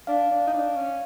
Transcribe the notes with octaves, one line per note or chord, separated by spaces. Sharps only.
D4 F5
D4
D#4
D4
C#4